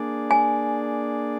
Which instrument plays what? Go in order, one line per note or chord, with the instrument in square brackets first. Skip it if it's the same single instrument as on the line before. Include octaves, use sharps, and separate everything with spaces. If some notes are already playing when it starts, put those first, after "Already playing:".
Already playing: [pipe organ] A#3 D4 G#4 D5
[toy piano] G#5